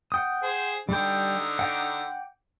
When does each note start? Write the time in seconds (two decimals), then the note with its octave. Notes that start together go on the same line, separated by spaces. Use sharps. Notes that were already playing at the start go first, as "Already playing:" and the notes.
0.12 F#5 G5 D#6
0.43 G#4 C5
0.89 D3 G3 D#4 G5
1.59 F#5 G5 D6